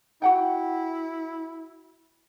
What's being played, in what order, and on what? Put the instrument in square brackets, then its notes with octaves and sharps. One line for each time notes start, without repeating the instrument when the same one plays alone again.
[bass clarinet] E4 [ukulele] F#4 F#5 G5